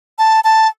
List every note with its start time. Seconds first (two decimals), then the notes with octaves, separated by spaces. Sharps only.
0.18 A5
0.44 A5